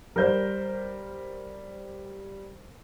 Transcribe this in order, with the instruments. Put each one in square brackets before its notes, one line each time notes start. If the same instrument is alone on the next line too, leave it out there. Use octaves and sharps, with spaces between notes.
[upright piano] G3 G6 [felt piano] A#4 C5